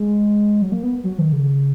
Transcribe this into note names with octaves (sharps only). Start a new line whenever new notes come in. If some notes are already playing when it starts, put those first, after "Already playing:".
Already playing: G#3
F#3
A#3
B3
F#3
D#3
C#3